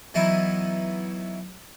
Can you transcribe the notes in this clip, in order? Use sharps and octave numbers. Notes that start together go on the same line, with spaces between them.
E3 F#3 B3 D#4 E4